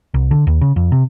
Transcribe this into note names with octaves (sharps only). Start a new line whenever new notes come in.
C2
D3
D#2
C#3
F2
C3